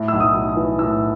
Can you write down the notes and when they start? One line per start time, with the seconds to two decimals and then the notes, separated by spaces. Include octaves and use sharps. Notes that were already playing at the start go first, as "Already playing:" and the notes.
Already playing: A2
0.08 B1 E6
0.20 D#6
0.34 B1
0.49 D#6
0.57 E3
0.79 A2 E6